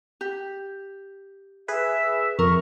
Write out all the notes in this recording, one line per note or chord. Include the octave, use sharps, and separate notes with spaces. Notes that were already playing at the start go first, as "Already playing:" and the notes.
G4
G#4 B4 E5
F2 A#4 C#6